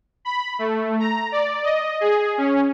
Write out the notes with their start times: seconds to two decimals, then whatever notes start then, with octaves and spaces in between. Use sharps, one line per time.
0.25 B5
0.59 A3
1.00 A#5
1.32 D5
1.64 D#5
2.01 G#4
2.38 C#4